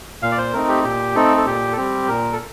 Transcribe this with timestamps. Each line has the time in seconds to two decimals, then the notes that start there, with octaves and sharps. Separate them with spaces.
0.22 A#2 F5
0.32 D5
0.38 C5
0.53 A3 C4 D#4 A#4
0.68 G4
0.84 A#2 G4
1.15 A3 C4 D#4 A4
1.37 A4
1.46 A#2 G4
1.72 A4
1.77 G3 C4 G4
2.08 A#2 A#4
2.32 A4